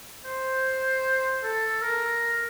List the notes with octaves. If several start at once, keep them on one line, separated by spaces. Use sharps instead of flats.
C5
A4
A#4